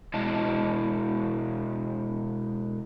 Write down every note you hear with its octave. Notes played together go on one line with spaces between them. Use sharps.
B2 G#3 E4 D#5 A5